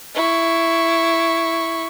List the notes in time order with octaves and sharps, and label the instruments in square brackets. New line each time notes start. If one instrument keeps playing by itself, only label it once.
[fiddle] E4 C#6